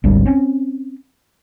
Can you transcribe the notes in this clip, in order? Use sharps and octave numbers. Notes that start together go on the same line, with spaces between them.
G#1 D2 G3 D4
C4 C#4